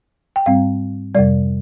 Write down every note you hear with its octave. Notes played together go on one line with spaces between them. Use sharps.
G5
G#2 G3 C4 F5
F2 C3 G3 D5